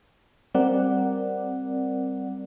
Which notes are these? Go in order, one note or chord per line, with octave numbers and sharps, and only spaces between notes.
G3 C4 A#4 D5 F#5